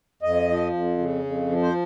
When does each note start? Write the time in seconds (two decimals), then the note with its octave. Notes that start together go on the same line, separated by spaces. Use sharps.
0.22 F2 D#5
0.48 F3
0.73 F2
0.98 C#3
1.24 F2
1.49 F3
1.63 C5